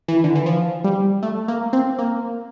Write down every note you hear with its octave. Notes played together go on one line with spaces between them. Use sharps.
E3
D3
E3
F3
G3
A3
A#3
C4
A#3